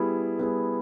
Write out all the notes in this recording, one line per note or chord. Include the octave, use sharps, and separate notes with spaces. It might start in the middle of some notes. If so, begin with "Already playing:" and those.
Already playing: G3 B3 E4 G#4
G3 B3 E4 G#4